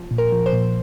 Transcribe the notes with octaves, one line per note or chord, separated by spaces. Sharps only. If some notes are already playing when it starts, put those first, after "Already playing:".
Already playing: F3
A#2
A#4
F3
C5
A#2